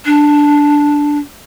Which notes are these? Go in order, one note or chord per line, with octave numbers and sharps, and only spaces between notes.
D4